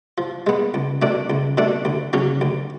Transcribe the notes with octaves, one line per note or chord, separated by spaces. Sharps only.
F3
G#3 B3
C#2
B2 A3 D4
C#2
B2 A3 D4
D2
C#3 F#3 C#4
D2